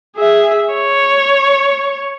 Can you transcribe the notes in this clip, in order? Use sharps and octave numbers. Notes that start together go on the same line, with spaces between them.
G#4 E5
C#5